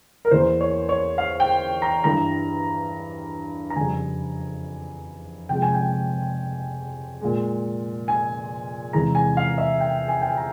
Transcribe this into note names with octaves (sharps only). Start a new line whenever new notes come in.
A#4
E2 E3 A#3 C5
C#5
C#5
F5
G5
A#5
G2 E3 G3 A#5
A#5
F2 C#3 G3 G#5
C3 F3 G#3 G5
G#5
G5
A#2 G#3
G#5
E2 C3 E3 G#3 A#5
G#5
F5
E5
G5
G#5
G5
G#5
A#5